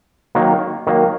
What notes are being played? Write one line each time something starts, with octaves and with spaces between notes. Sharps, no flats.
D#3 F#3 A#3
D#3 F#3 A#3